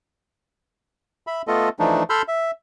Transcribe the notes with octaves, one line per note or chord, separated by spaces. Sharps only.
E5 B5
A3 B3 F4 A4 D#5
E3 F3 A3 D4 D#4
A4 B5 C6 E6 F6 G6
E5